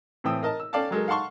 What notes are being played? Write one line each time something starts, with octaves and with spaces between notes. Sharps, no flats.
A2 E3 C4 G5 D#6 E6
A#4 D#5 A5
E6
C#4 A4 D5 F5 G5 A5
F#3 G#3 A4 A#4
F5 F#5 A5 C6 C#6